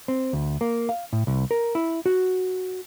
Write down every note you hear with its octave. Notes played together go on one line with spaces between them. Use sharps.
C4
D2
A#3
F5
A2
C2
A#4
E4
F#4